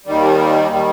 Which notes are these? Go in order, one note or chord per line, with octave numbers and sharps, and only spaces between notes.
D#2 D#3 G3
D#3 G3